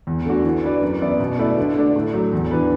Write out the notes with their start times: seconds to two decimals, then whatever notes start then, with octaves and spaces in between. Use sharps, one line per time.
0.07 E2
0.26 D3 A3 D4 F#4
0.44 E3
0.63 D4 B4 D5
0.82 F#2
1.01 E3 B3 E4 D5
1.20 B2
1.39 A3 E4 B4 D5
1.58 D3
1.76 A3 D4 A4 D5
1.95 A2
2.14 F#3 A3
2.32 E2
2.51 E3 D4 B4